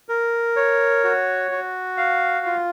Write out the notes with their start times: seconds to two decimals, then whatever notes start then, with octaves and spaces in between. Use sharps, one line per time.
0.09 A#4
0.56 C#5
1.04 F#4
1.51 F#4
1.97 F5
2.46 F4